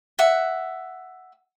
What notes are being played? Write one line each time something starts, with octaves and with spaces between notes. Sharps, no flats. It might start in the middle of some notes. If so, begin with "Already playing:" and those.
E5 F#5